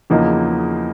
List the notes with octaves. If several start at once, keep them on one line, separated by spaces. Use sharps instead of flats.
E2 C#3 F3 A#3 D#4